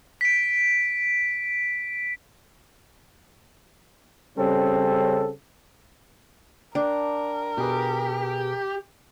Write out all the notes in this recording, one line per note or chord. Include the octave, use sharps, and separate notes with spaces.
B6 D7
C#3 G3 C4 C#4 A4
D4 A#4 G5
B2 G4 G#4 B4